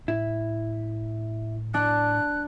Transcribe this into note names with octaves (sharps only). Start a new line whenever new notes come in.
A2 E4
D4 F#6